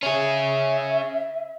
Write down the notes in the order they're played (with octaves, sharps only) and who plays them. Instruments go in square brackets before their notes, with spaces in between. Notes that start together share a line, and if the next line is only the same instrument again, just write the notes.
[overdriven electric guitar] C#4 G#4 [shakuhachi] E5